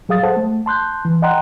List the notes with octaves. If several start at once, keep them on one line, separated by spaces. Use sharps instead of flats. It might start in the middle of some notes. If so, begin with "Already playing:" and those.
F#3 G#4 F5 D#6 A6
A4 C5 F#5 A5
A3
A5 C6 F#6 G6
E3
D#5 F#5 G5 A#5 C6 F#6